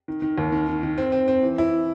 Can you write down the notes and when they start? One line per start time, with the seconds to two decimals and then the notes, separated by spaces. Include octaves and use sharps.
0.08 D#3
0.22 D#3
0.38 D#2
0.52 D#3
0.68 D#3
0.83 D#3
0.98 C4
1.12 C4
1.28 C4
1.43 E3
1.58 E4